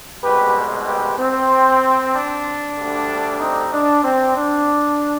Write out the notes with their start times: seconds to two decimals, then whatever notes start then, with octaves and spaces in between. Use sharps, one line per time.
0.24 C2 B2 G#3 G4 B4
0.87 G4 B4
1.19 C4
2.14 D4
2.77 D2 D3 G3
3.40 C4 D#4
3.73 D4
4.04 C4
4.36 D4